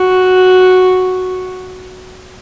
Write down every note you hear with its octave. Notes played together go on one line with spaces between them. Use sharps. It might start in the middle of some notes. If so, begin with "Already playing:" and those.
Already playing: F#4